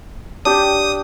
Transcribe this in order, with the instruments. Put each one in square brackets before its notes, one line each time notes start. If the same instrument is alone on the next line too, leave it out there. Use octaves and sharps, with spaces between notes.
[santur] D4 G4 G5 [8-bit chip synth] D#6